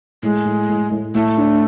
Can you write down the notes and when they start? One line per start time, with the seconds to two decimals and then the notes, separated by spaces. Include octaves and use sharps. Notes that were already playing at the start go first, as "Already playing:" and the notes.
0.23 A2 G#3
0.45 A2
0.69 A2
0.91 A2
1.15 A2 A3
1.38 D4